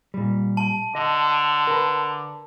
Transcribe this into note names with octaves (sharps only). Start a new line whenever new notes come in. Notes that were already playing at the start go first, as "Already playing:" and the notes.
A#2 G3
A5
D3 D#5
A#4 B4